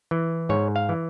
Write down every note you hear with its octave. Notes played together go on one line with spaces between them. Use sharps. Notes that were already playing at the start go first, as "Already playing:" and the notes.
E3
G#2 C#5
F5
E3